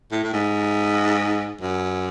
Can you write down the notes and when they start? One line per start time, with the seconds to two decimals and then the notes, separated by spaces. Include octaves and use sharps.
0.12 A2
0.24 A2
0.33 G#2
1.61 F#2